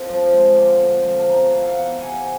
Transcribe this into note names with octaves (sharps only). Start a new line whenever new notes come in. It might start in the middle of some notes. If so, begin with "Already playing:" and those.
Already playing: F2
F3
G#3
D3
F2
F3
A5
E2 A#5
E3 F5
F#5
F5
E2 F#5
C3 G#5